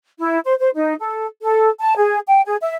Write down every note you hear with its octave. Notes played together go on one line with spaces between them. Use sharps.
E4
C5
C5
D#4
A4
A4
A5
G#4
G5
G#4
E5